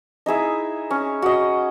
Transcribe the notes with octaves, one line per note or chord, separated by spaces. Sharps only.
D#4 E4 G#4 E5
C#4
F#4 D#5